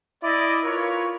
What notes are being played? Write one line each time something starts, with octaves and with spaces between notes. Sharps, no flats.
E4 D5 D#5
F4 A#4 B4 C#5